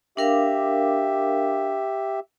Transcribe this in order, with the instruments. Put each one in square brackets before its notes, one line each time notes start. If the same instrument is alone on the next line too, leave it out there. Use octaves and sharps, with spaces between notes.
[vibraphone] D4 A#4 F5 [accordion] G4 E5